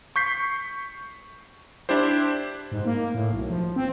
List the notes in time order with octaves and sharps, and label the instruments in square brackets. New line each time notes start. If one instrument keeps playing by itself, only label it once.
[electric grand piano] C#6 G6 B6 C7
D4 E4 G4 C5
[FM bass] G#2
A#3
A2
B1
F3
C4